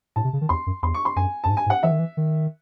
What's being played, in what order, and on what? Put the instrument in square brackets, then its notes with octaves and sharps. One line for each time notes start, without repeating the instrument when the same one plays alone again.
[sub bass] A2 [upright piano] A5
[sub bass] C3
C#3
D#3
[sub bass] E2 [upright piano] C6
[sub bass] F#2
[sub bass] E2 [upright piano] C6
[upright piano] C#6
C6
[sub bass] F#2 [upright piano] G#5
[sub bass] F#2 [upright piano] A5
[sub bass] G#2
[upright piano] G#5
[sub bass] G#2
[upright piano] F#5
[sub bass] E3 [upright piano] E5
[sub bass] D#3
E3
D#3